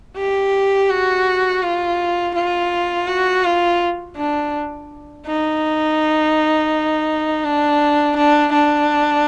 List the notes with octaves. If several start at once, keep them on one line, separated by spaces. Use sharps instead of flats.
G4
F#4
F4
F4
F#4
F4
D4
D#4
D4
D4
D4